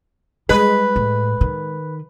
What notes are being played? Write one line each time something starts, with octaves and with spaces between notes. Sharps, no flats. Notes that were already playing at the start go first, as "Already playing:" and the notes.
G3 G#3 B4
A2
D#3